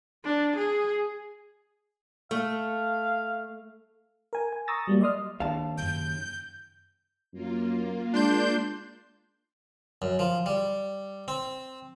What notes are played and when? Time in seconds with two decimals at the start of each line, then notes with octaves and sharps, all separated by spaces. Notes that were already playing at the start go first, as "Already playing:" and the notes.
0.24 D4
0.57 G#4
2.31 A3 F5
4.33 A#4 G#5
4.53 G#5
4.68 A#5 C#6 D#6 E6 A6 A#6
4.87 F#3 G3 A#3
5.01 D5 D#5 C6 D#6 F6
5.40 D#2 C4 D4 F5 A5
5.78 F#2 C#3 G6
7.33 F#2 A#3 F4
8.14 G#3 D4 C6 G6
10.02 F#2
10.19 F3
10.46 G3
11.28 C4